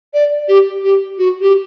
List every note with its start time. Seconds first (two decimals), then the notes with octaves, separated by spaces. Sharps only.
0.14 D5
0.48 G4
0.84 G4
1.18 F#4
1.41 G4